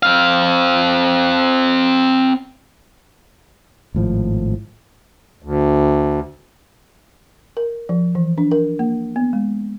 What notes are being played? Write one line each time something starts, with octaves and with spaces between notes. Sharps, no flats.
C4 F5
G#1 A2 F3
D2
A#4
F3
E3
D4
A#4
A#3
B3
G#3